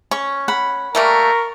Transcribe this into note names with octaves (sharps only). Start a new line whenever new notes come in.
C#4 C#6
F#5 B5
G3 A3 A#3 A#4 A#5 C#6